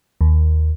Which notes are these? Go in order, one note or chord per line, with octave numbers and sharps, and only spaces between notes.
D#2